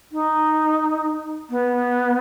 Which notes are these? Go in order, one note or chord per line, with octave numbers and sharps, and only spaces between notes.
D#4
B3